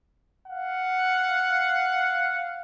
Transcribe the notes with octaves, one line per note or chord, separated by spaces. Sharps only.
F5 F#5